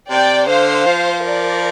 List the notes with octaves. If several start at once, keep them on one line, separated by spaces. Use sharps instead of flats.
C3 D5 G5
D3 C5 F5
F3
A#4 D5